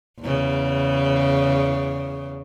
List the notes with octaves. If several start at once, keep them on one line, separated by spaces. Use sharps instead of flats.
E2 C#3